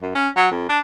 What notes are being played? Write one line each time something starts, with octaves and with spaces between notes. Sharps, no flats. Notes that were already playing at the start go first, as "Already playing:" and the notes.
F#2
C#4
F#3
F2
D4